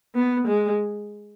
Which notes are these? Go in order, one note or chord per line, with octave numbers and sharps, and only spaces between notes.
B3
G#3